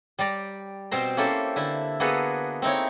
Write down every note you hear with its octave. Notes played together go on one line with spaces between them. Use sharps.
G3 G4 D5 A#5
B2 C4 C5 A#5
A#3 C#4 E4 G4 A4 C5
D3 E4
A#3 B3 F#4 G#4 A4 B4
C4 D#4 E4 C#5